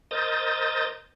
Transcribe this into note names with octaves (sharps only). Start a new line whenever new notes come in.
A#4 C5 D#5 D#6 G6 A6